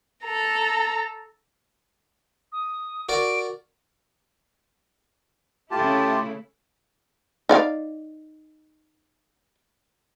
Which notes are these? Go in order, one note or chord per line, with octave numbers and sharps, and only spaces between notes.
A4 A#5
D#6
F#4 A#4 D5 D7
C#3 A3 E4 F4 G4 A5
D#4 D5 F5